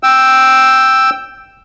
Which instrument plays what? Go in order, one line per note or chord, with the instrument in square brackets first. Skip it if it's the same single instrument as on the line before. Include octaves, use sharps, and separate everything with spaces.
[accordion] G5 E6